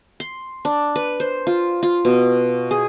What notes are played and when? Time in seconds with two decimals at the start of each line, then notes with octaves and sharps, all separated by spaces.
0.20 C6
0.65 D4
0.96 B4
1.20 C5
1.47 F4
1.83 F4
2.05 B2
2.71 G#4